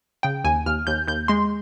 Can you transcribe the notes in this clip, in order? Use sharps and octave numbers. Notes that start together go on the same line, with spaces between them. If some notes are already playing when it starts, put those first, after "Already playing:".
C#3 G5
D#2 G#5
D#2 F6
D#2 G6
D#2 G6
G#3 C6